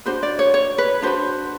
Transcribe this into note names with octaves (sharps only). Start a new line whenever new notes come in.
D4 F#4 B4 C5
D5
C#5
C#5
B4
D4 F#4 B4 C5